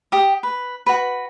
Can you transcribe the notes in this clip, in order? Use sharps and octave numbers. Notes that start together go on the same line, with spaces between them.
G4 D#6
B4
F#4 B4